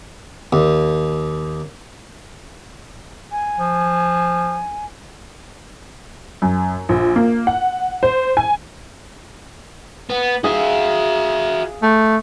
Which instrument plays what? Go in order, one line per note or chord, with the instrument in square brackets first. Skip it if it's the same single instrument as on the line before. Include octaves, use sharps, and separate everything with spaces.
[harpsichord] D#2
[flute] G#5
[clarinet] F3
[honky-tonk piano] F#2
A#1
A#3
F#5
C5
G#5
[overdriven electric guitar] B3
[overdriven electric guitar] F#4 E5 [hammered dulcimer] G#4 F5
[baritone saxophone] A3